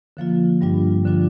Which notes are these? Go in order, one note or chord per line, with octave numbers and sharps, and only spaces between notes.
D3 F3 A#3 F4
G2 G3 D4 F4
D3 F3 D4 F4